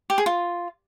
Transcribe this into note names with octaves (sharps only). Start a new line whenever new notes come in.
G4
G#4
F4